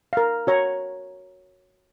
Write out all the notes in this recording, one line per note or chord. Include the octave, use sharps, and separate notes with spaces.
A#4 F5
F#4 C#5 A#5